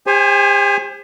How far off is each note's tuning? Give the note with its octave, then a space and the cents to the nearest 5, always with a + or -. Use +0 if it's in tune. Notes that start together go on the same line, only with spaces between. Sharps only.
G4 +45 C5 +25 G#5 +0